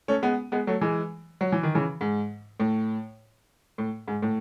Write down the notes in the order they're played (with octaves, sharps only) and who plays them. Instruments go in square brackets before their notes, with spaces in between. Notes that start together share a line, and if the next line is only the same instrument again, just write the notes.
[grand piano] A3 C#4
G#3 B3
G#3 B3
F#3 A3
E3 G#3
F#3
E3
D#3
C#3 E3
G#2
A2
A2
G#2
A2